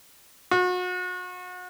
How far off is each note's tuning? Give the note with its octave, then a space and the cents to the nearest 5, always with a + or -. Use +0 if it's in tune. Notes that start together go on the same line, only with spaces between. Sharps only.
F#4 -35